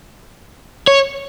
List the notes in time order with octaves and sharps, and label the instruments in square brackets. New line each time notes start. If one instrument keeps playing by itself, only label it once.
[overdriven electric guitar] C#5